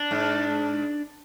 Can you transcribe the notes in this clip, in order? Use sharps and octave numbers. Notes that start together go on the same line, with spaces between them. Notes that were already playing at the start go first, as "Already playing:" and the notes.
Already playing: D4
G#2